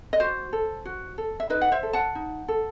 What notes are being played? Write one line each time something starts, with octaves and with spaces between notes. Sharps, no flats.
D#5
F#4 C5
A4
F#4
A4
E5
D#4 B4 D#5
F#5
C5 E5
A4
F#5 A5
D#4
A4